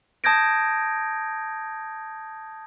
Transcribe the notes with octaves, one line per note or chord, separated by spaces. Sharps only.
A5 D#6 G6 G#6 A#6 D7